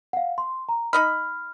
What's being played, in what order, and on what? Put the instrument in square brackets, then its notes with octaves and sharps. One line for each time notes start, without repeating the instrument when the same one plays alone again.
[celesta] F5 F#5
C6
A#5
[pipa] D#4 D#5 B5 [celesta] F6